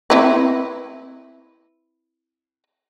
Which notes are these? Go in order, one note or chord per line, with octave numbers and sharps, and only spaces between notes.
C4 E4 B4